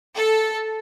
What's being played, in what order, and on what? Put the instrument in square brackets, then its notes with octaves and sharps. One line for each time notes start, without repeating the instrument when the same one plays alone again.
[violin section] A4